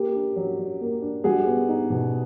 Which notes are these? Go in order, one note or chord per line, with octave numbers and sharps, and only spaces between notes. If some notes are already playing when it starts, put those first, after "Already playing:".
Already playing: A#3 G4
D4
F#3
F#3
A#3
D4
G3 F#4 G#4
B3
D#4
B2